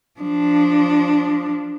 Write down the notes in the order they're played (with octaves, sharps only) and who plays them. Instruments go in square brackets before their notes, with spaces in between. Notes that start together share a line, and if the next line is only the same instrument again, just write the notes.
[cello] F3 D4